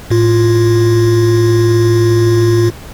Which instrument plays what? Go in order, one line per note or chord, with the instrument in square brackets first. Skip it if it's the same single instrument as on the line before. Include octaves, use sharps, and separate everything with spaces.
[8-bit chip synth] A2 F4